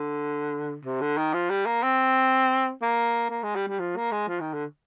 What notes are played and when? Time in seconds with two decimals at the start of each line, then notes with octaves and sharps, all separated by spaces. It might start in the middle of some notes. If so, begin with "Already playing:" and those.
Already playing: D3
0.85 C3
1.01 D3
1.17 D#3
1.33 F3
1.50 G3
1.66 A#3
1.83 C4
2.82 A#3
3.30 A#3
3.43 G#3
3.55 G3
3.68 G3
3.80 F3
3.96 A#3
4.12 G#3
4.28 F3
4.40 D#3
4.54 D3